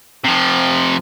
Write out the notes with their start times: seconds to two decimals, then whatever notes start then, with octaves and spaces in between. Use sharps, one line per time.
0.24 C3 F3